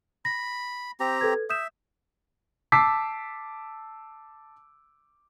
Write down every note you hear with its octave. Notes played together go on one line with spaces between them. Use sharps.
B5 A#6
C4 G4 A#5
A4 B4 G#6
E5 D#6 G6 E7
A5 D6 E6 B6 C7